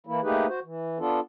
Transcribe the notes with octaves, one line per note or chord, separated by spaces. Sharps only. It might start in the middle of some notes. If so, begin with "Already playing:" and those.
E3 A#3 E4
A3 A#3 D#4 G4 G#4 B4
F#4 C5
E3
B3 D4 F4 A4